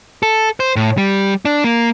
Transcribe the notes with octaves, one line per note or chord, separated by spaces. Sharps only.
A4
C5
A2
G3
D4
A#3